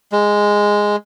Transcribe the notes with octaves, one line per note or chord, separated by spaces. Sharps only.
G#3